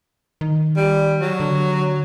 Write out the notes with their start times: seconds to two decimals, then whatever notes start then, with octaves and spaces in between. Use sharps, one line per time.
0.41 D#3
0.76 G3
1.21 F#3
1.40 D3